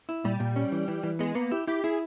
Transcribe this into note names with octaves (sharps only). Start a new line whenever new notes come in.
E4
A#2 G3
A#2
C#4
E3
E3
E3
G#3 B3
A#3 B3
E4 G4
E4 G4
E4 G#4